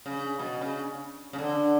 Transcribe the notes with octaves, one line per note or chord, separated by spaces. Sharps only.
C#3
B2
C#3
C#3
D3